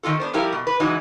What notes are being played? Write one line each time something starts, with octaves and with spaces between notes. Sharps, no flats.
D#3 C4 F4 A4
B3 D4 C5
F3 G3 E4 G4 A#4
B2
B4
C#3 E3 F#3 G#3 D#4